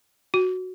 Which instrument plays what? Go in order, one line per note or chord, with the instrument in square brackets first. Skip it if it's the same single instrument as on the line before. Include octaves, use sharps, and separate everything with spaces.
[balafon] F#4